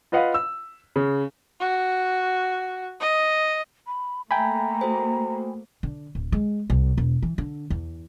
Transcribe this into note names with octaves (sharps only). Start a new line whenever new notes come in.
F4 B4 D#5 F5 F#5 B5
E6
C#3
F#4
D#5
B5
A3 A#3 E5 G5 G#5 A#5 B5
F#4 A4 C5
D3
D1
G#3
C2
E1
E3
D3
E2